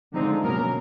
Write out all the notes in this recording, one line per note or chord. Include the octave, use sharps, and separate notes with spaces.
D3 F3 G#3 C4 D#4
B2 F#3 A#3 C#4 A#4